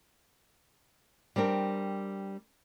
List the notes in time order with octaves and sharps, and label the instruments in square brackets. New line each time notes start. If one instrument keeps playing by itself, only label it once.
[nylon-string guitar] G3 C4 D4 A#4